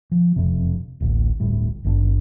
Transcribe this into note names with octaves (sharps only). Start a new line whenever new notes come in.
F3
E1 F2 C3
D1 A1
D1 G1 A2 G3
G#1 G2 C#4 D4